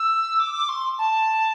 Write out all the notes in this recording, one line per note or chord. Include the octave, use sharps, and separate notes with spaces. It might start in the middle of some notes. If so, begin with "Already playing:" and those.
Already playing: E6
D6
C6
A5